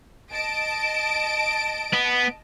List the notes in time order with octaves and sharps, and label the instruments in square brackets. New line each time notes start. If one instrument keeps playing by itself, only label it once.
[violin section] D#5 A5 D7
[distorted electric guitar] B3